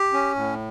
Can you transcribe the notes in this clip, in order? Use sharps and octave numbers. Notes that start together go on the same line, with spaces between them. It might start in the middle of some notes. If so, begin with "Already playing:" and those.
Already playing: G4
C#4
A2